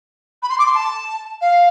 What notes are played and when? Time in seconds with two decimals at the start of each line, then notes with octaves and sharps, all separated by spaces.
0.42 B5
0.50 C6
0.59 D6
0.66 C6
0.75 A5
1.41 F5